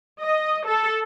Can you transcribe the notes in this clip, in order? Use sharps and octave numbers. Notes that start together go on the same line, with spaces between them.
D#5
A4